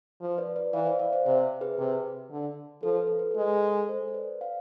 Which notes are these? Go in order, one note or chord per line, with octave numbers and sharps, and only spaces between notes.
F3
C5
B4 D5
B4 D5
E3 D5 F5
C5 E5
D5 F5
C5 E5
C3 C5 E5
G#4 B4
C3
D3
F3 A4
B4
A4
B4
A4
G#3
A4 C5
C5
B4 D5
D5 F5